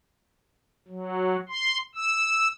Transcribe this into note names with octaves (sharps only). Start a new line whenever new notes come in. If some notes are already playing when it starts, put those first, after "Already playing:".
F#3
C6
E6